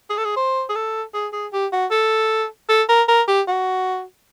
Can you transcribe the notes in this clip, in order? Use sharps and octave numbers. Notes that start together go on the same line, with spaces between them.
G#4
A4
G#4
C5
G#4
A4
G#4
G#4
G4
F#4
A4
A4
A#4
A#4
G4
F#4